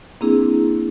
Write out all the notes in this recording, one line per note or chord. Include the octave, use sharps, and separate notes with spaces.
A#3 C4 D4 E4 G#4